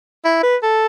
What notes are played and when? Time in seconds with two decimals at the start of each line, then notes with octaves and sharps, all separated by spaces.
0.25 E4
0.43 B4
0.63 A4